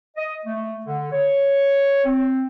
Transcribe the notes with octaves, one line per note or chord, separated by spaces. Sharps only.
D#5
A3
D3
C#5
C4